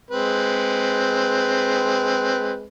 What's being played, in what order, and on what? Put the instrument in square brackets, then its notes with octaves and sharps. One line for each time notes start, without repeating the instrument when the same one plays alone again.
[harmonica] G#3 C4 B4